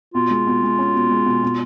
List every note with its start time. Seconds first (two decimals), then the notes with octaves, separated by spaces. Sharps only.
0.15 B2 F4
0.30 G#3
0.47 B2
0.63 G#3
0.79 C#4
0.95 B2
1.11 G#3
1.26 B2
1.43 B2